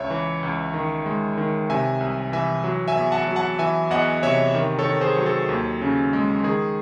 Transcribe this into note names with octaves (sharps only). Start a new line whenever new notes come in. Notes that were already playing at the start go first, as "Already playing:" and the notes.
Already playing: C#2 C#5 E5
E3
C#2
D#3
G#3
D#3
C3 E5 G#5
C2
E3 E5 G#5
F#3
E5 G#5
E2
F#5 A5
F#3
F#5 A5
E3 E5 G#5
E2 D#5 F#5
C3 C#5 E5
D#3
A4 C#5
D#3
G#4 C5
F#3
A4
D#2
C#3
G#3
D#3 G#4